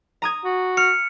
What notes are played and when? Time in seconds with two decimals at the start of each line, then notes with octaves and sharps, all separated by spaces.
0.22 A#5 D#6 G#6
0.45 F#4
0.77 F6 C#7